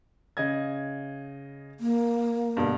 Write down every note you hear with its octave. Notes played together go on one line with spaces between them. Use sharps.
C#3 D#5 G#6
A#3
G2 B2 D3